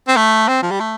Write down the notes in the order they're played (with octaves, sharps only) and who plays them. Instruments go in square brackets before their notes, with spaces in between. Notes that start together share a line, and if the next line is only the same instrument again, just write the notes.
[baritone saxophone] C4
A3
C4
F3
G3
A3